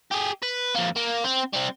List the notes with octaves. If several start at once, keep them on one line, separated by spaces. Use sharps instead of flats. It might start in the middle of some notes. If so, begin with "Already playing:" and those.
G4 G#4
B4
F2 A#3
A#3
C4
G3 C4